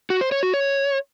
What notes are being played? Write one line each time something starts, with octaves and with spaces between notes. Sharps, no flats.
F#4
C5
C#5
F#4
C#5